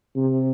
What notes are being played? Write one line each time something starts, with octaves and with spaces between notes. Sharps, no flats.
C3